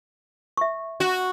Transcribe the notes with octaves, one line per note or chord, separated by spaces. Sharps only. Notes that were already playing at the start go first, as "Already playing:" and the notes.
E5 C#6
F#4